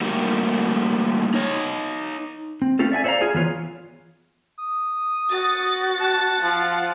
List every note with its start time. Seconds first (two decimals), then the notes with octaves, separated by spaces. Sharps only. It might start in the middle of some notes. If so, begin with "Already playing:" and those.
0.01 G3 A3 A#3 D#4 F#4 G4
1.34 D#4 C#5
2.62 C4
2.79 A3 C4 C#4 F4 A4
2.92 D5 E5 G5 G#5
3.04 A4 C5 D5 E5 F5 A#5
3.21 F4 G#4 G#5
3.34 E3 B3 F4 C#5
4.59 D#6
5.30 F#4 A6
6.00 F#5 A5
6.42 F3